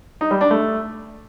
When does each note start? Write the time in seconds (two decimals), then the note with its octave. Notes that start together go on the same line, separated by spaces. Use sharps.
0.21 D#4
0.31 G3
0.41 D4
0.51 A3